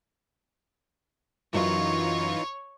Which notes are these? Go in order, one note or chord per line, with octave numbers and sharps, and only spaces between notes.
F#2 E3 F#3 D#4 F4 C#5